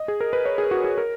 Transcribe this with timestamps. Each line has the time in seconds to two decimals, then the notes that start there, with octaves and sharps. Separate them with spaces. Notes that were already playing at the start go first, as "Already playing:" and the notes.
Already playing: D#5
0.08 G#4
0.21 A#4
0.33 B4
0.46 C#5
0.58 G#4
0.71 F#4
0.84 G#4
0.98 A#4